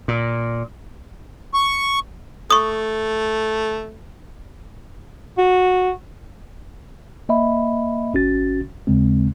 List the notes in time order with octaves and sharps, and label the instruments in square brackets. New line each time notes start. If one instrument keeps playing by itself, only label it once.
[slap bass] A#2
[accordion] C#6
[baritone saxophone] A3 [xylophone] C#6 D#6
[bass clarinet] F#4
[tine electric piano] A#3 D#5 E5 B5
G#1 C#4 F#4 A6
D#2 C#3 G#3 C4